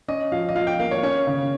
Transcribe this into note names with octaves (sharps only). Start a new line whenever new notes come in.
C#4 D#5
F3 F5
D#5
F3 F5
G5
A#3 F5
C#5
C#4 C#5
C#3